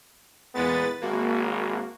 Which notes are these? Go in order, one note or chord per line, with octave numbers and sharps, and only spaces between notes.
E2 A#2 G#3 B3 B4 A6
G#1 A#3 F#4